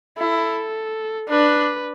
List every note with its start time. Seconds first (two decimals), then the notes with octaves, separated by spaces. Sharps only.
0.18 E4 A4
1.29 D4 B4